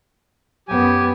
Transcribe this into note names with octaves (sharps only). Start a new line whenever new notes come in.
F#2 B3 G4 G#5